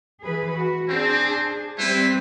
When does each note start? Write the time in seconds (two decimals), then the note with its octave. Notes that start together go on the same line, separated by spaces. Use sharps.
0.23 E3 G#4 B4
0.53 F#4
0.88 C4 D4 G#4
1.79 G3 C4 E4 B4 C5